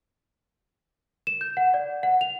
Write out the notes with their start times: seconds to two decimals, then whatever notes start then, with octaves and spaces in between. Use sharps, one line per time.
1.27 E7
1.41 G6
1.57 F#5
1.74 D5
2.03 F#5
2.21 F7